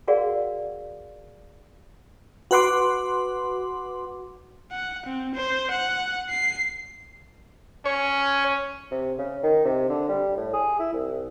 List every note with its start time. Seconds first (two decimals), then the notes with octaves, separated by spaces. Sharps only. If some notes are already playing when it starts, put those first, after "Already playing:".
0.08 F#4 G#4 A#4 D5 F5 F#5
2.51 F#4 B4 F#5 C6 D6
4.72 F#5
5.06 C4
5.35 C5
5.71 F#5
6.30 C7
7.85 C#4 C#5
8.91 C3
9.18 C#3
9.43 D#3
9.65 C3
9.88 D3
10.09 G3
10.36 A2
10.53 G#4
10.79 E4
10.93 C2